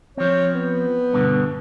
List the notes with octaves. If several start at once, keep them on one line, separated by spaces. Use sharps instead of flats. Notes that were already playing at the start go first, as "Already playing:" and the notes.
F3 C4 C#5
B3
G2 B2 D3